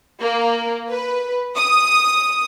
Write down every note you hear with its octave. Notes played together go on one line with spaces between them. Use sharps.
A#3
B4
D#6